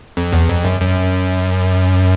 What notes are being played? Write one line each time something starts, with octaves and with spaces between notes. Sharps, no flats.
F2
E2
F2
F#2
F#2